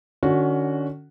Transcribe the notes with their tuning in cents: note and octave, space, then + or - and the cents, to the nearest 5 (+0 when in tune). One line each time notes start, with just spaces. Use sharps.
D3 +35 C#4 +25 F#4 +0